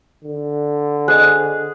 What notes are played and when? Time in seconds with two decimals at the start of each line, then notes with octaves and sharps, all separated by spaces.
0.25 D3
1.08 G#4 C5 D#5